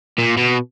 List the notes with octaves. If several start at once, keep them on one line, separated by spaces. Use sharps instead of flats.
A#2
B2